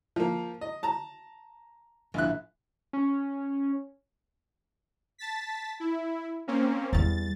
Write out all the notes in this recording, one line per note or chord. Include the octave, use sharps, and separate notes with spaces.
F3 A#3
D#5
A5 A#5
A#1 E4 F#6
C#4
A5 A6 B6
E4
A#3 C4 C#4
E2 G3 A6